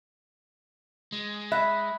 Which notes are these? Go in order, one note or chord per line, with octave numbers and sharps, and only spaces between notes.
G#3
E5 B5 F#6